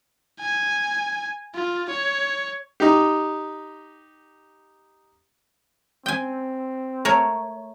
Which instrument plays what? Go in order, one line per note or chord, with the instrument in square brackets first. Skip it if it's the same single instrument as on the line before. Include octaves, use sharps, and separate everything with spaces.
[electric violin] G#5
F4
C#5
[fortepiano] D#4 G4
[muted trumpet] C4 [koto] G5 G#5
[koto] A3 A#4 C#5